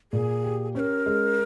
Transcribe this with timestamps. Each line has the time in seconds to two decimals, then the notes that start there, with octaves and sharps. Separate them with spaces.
0.13 A#2 G#4
0.44 G4
0.75 C#4 C5
0.79 A#4
1.06 G#3